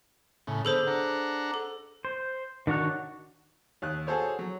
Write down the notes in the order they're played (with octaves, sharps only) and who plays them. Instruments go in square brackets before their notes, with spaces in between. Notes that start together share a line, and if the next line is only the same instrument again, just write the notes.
[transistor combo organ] A2 C#3
[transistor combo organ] D3 B3 [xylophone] G#4 A4 C5
[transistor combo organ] D4 F#5 A#5
[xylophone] A4
[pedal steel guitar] C5
D#3 D4 F#4 C#5 F#6
[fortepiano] D#2 F#6
F#4 G#4 A4 C5 C#5
F#3